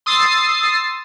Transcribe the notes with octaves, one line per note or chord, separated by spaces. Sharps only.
C6 D#6 E6 A6 C7